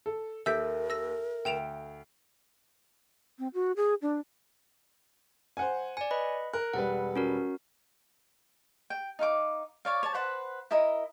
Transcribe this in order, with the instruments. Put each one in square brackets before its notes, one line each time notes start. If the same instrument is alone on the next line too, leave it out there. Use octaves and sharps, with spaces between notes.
[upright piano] A4
[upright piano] D#2 [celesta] A4 E5 [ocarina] A#4 [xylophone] E6 G6 B6
[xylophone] E6 A#6
[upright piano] D2 D7 [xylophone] G5 E7 F7
[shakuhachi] C4
F#4
G#4
D4
[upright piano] C5 F#5 G#5
[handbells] D5 G#5 [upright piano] C#7
[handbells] B4 D#5 B5
[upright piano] A#4 [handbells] F#6
[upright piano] E1 G3 B4 [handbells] F#5
[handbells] C#4 F#4 A#4
[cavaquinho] G5
D#4 F5 G5 D6
C#5 D5 F5
C#5 A5
B4 C5 F#5 B5
E4 A#4 D#5 A#5